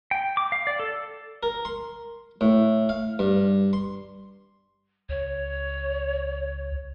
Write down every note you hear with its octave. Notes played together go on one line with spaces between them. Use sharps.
G5
D6
F5
D5
A4
A#4
C6
A2
F5
G2
C6
C#2 C#5